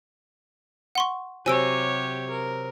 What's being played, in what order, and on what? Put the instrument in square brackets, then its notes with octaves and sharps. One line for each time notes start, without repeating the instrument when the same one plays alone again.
[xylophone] F#5 C6 C#6
[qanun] C3 F#3 [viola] G4 C#5 [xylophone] G#5 E6 D7
[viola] A#4